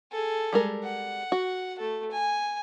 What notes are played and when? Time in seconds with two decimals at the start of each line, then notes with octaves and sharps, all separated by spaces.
0.12 G#4 A4
0.53 G3 G#3 A#4
0.84 F#5
1.32 F#4
1.78 A3 A4
2.11 G#5